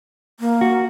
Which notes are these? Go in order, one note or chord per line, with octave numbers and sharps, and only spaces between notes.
A#3
F#4